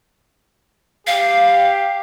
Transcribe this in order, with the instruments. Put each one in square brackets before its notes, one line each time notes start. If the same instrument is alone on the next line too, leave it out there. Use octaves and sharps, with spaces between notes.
[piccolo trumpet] G4 [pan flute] F5